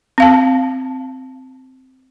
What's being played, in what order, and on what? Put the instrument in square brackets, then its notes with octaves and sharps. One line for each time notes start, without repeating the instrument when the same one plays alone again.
[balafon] C4 F5 A5